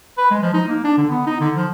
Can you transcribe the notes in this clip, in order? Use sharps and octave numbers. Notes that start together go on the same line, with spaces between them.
B4
G#3
F3
D#4
A#3
D4
D3
B3
D#4
D3
F3